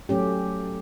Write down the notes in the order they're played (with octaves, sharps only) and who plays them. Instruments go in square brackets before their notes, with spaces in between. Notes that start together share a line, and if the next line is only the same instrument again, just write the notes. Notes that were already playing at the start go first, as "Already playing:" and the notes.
[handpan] F#3 A3 C#4 G4